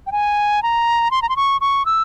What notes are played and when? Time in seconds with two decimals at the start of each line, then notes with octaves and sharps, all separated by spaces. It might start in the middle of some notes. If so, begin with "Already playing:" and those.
0.07 G5
0.12 G#5
0.63 A#5
1.11 C6
1.22 A#5
1.29 C6
1.37 C#6
1.61 C#6
1.86 E6